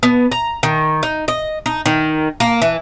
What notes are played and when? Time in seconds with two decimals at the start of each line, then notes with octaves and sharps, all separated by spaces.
0.03 B3
0.32 A#5
0.63 D#3
1.03 D#4
1.28 D#5
1.66 D#4
1.86 D#3
2.40 A#3
2.62 E3